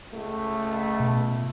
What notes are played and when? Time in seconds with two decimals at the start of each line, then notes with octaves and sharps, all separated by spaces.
0.14 C#2 A3
1.00 B2